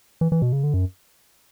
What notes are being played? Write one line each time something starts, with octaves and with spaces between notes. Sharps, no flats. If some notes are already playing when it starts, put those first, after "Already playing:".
E3
E3
B2
C#3
D3
F#2